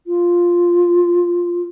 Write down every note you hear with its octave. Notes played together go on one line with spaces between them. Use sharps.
F4